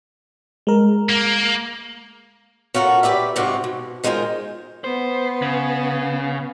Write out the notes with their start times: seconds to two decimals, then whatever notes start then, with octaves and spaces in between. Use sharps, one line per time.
0.67 G#3 A#4
1.09 A#3
2.74 C#4 F4 F#4 A4 A#4
3.03 G4 B4 D5 E5
3.36 G#2 C3 F4 F#4
3.64 B2
4.04 D#3 G#3 F4 F#4 A#4 C5
4.84 B3 C5
5.42 C#3